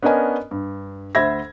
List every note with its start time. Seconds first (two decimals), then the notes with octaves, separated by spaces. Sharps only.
0.03 B3 C#4 D4 A#4 D#5 G#5
0.51 G2
1.15 D2 C5 E5 B5 G#6 A#6